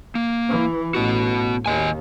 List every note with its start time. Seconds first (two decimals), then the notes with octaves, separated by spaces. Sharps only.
0.15 A#3
0.49 E3
0.94 A1 B3 F#4
1.66 D#2 D#3 D#5 G#5